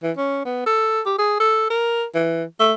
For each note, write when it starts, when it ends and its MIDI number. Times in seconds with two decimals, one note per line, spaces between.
0.03 0.12 52
0.17 0.41 61
0.45 0.65 59
0.66 1.01 69
1.06 1.15 67
1.18 1.36 68
1.40 1.67 69
1.70 2.05 70
2.15 2.44 52
2.60 2.73 57